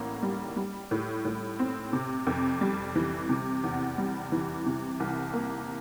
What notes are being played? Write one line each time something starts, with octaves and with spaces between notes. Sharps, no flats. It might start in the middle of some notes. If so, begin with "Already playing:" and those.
Already playing: A1 A2 A#3
G3
G3
A2
A2
C4
C3
F2
G3
E3
C3
E2
G3
E3
C3
C2
A#3